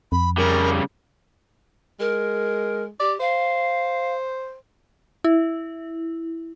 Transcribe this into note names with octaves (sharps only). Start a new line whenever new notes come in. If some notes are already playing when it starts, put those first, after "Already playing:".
F2 B5
C#3 G3 A#4
G#3 A#4
G4 D5
C5 F5
E4